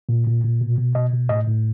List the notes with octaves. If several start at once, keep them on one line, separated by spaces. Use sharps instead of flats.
A#2
A#2
A#2
B2
B2
B2 D#5
B2
A2 D#5
A2